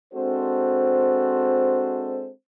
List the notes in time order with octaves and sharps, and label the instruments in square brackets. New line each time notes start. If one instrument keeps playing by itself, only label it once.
[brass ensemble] G#3 C4 D4 F#4 A4 C5